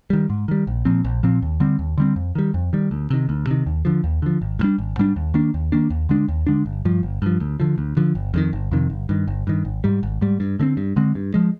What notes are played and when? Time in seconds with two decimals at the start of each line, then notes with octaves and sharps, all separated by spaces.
0.10 D#3 G3
0.30 G#2
0.48 D#3 G3
0.67 A#1
0.85 A#2 F3 C4
1.04 A#1
1.23 A#2 F3 C4
1.42 D#2
1.60 D3 G3 C4
1.79 D#2
1.98 D3 G3 C4
2.16 F2
2.35 D#3 G3
2.54 F2
2.73 D#3 G3
2.91 D2
3.10 C3 D#3
3.29 D2
3.47 C3 D#3
3.66 D#2
3.85 D3 F3
4.04 D#2
4.22 D3 F3
4.42 G#1
4.59 G#2
4.63 G3 D4
4.78 G#1
4.97 G#2 G3 D4
5.16 D#2
5.34 D#3 A#3 D4
5.54 D#2
5.72 D#3 A#3 D4
5.90 D#2
6.09 D3 G#3 D4
6.28 D#2
6.47 D3 G#3 D4
6.66 G1
6.85 G2 F3
7.03 G1
7.22 G2 F3
7.40 D2
7.60 D3 F3
7.78 D2
7.97 D3 F3
8.15 G1
8.34 F2 C3 D#3
8.53 G1
8.71 F2 C3 D#3
8.90 G1
9.09 G2 D#3
9.28 G1
9.47 G2 D#3
9.65 G#1
9.84 G#2 G3
10.03 G#1
10.21 G#2 G3
10.40 G2
10.59 D3 G#3 C4
10.77 G2
10.96 D3 G#3 C4
11.15 G2
11.34 F3 G#3